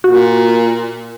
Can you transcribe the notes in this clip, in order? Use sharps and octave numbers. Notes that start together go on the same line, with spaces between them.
A#2 F#4